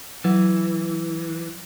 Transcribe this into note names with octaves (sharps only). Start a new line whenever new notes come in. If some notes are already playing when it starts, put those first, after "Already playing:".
E3 F#3